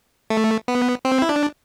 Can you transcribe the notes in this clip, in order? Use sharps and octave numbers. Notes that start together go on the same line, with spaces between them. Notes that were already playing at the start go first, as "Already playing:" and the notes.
A3
B3
C4
E4
D4